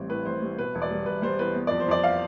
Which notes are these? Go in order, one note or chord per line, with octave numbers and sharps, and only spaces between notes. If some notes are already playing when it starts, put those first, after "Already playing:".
Already playing: A1 G3 C4
A2 B4
A1 C5
G3
B2 B4
E1
D5
G3
E1 B4
G3 C5
E2 B4
B3
F2 D5
C5
F2 D5
F5